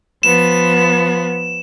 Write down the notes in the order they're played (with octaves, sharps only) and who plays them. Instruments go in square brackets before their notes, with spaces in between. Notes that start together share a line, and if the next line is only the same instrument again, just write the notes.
[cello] F3 B3 [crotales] E7